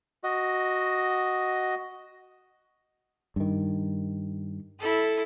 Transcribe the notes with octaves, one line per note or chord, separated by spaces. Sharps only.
F#4 D#5
G2 D#3
E4 A4